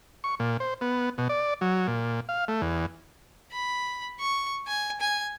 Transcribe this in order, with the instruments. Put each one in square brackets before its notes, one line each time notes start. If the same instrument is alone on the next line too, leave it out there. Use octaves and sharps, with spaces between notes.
[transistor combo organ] C#6
A#2
C5
B3
B2
D5
F#3
A#2
F5
A3
E2
[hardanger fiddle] B5
C#6
G#5
G#5